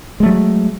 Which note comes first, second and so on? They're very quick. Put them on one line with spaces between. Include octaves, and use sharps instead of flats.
G#3 A3 F#3